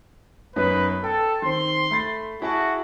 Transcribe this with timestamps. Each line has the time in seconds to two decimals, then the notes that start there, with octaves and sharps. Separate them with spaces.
0.56 F#2 B3 D#4 B4
1.04 A4 G5
1.42 D#3 C4 C6
1.91 A3 B5 A6
2.42 E4 F#4 G#4 A5